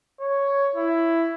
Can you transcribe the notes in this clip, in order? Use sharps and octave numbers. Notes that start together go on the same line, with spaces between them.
C#5
E4